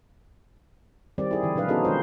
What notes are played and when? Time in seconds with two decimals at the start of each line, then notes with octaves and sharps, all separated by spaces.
1.18 D#3 G3 C4 D5
1.31 E4 G#4
1.43 D3 E3
1.55 B2 F#3 D4 B4 F5
1.68 B3 C#4 D#4 F#4 G#4 A4
1.85 D#3 G#3 F4 C5